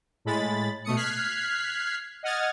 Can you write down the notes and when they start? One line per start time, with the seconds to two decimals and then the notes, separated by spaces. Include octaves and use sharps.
0.25 A2 G#3 B5 A6
0.84 B2 A3 D#6 C#7
0.96 F6 F#6 G#6 B6 C7
2.23 D#5 F#5 D#6 F6 G#6 A6